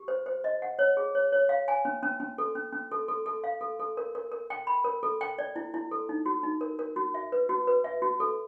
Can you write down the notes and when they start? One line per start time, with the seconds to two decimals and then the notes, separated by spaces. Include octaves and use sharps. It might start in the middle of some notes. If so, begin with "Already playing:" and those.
Already playing: G4
0.08 C5
0.26 C5
0.44 D#5
0.62 F#5
0.79 C#5
0.97 G#4
1.15 C#5
1.32 C#5
1.49 F5
1.68 G#5
1.85 C#4
2.03 C#4
2.20 C#4
2.38 A4
2.55 C#4
2.73 C#4
2.91 A4
3.08 A4
3.26 A4
3.44 F5
3.61 A4
3.79 A4
3.97 A#4
4.15 A#4
4.32 A#4
4.50 G5
4.67 B5
4.84 A#4
5.03 A4
5.21 G5
5.38 D5
5.56 E4
5.74 E4
5.91 A4
6.09 D#4
6.26 F#4
6.43 D#4
6.61 A#4
6.79 A#4
6.96 F#4
7.14 E5
7.32 B4
7.49 F#4
7.67 B4
7.84 E5
8.02 F#4
8.20 A4